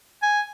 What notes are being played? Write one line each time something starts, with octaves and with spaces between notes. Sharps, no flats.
G#5